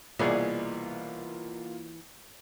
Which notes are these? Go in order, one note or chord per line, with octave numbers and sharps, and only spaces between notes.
C2 B2 E3 A#3 F4 G#4 D5